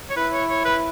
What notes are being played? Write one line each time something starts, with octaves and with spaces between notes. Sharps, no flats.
C#5
E4 B4
C#5
C#5
B4